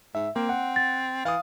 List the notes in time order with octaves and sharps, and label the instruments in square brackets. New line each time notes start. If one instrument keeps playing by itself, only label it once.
[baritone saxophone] G#2 [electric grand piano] E5
[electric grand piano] A#3 [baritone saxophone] C4
[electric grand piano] F#5
[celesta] A6
[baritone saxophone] E3 [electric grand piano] F5 D#6